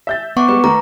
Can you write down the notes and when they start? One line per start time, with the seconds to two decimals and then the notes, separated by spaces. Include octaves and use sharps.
0.07 E5 G6 A6
0.37 B3 E5 F#5 C#6 D6
0.49 G3 G#3 B4
0.64 D#3 A3 A#5